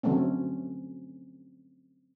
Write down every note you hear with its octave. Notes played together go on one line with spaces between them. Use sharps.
D3 F#3 A3 C4 C#4